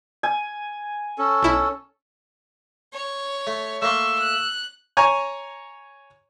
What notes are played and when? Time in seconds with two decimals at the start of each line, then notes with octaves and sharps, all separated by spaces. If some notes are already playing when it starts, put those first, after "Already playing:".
0.23 G#5
1.18 C#4 A4
1.43 B1 E4
2.93 C#5
3.47 A3
3.82 A3 A#3 C6 C#6 E6
4.19 F#6
4.97 C#5 G#5 A#5 C#6